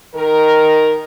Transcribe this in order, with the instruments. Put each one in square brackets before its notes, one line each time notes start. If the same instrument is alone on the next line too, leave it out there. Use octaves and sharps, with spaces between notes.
[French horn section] D#3 A#4